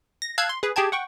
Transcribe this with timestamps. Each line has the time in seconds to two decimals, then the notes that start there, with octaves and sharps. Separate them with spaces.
0.22 A#6
0.38 F5 A5 E6 F#6 G#6
0.49 C6
0.63 G#4 B4
0.76 G4 G#4 G5 A5 G#6
0.92 F#5 G5 C#6